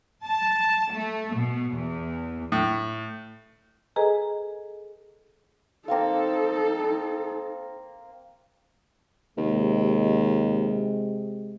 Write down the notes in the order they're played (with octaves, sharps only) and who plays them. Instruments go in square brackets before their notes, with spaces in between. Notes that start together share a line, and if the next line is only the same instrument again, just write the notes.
[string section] A5
A3
B2
E2
[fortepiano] A2
[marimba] G#4 A4 B4 D#5 G#5 A#5
[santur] A#3 C4 F5 [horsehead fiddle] D#4 A4
[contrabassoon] D#2 [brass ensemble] C3 G#3